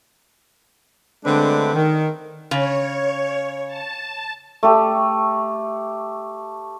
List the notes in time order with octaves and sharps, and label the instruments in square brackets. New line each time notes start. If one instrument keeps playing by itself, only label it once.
[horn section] D3 G#3 A3 C4 D4 B4
D#3
[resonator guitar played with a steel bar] C#3 [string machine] C#5
[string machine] A5
[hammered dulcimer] A3 G4